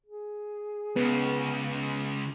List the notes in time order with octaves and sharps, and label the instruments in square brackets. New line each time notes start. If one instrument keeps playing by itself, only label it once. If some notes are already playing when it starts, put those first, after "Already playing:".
[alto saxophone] G#4
[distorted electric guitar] C#2 C#3 [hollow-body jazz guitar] B3